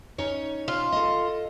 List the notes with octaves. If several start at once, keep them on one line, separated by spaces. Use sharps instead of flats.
C#4 D#4 C#5
F4
A4 D#5